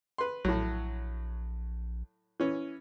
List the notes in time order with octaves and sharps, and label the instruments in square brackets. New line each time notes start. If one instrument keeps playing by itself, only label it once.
[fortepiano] B4 C6
[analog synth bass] A#1 [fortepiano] A2 F#3
[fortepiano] E3 C#4